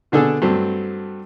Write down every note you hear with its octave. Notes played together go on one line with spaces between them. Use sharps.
B2 D3 D4 G#4 A4
G2 F#3 A3 C4